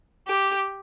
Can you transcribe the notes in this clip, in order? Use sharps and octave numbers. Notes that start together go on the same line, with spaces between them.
G4